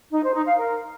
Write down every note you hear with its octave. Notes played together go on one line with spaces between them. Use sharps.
D#4
C5
D#4
F5
A#4